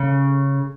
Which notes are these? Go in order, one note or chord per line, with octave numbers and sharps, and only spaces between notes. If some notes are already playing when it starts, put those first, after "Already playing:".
Already playing: C#3